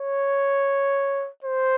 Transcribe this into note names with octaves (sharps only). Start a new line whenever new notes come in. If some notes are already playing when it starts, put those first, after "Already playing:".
Already playing: C#5
C5